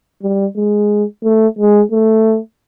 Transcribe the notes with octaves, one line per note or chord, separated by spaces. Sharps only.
G3
G#3
A3
G#3
A3